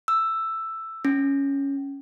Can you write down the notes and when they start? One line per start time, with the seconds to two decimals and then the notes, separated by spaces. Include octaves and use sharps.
0.08 E6
1.05 C#4